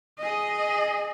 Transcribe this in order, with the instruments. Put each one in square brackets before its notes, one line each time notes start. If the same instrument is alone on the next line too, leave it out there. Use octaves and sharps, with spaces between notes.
[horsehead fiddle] G#4 D#5